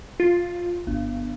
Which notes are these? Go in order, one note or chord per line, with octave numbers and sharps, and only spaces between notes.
F4
G1